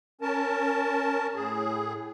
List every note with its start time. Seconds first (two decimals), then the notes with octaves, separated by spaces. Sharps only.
0.21 C#4 A#4 A5
1.35 A2 G#4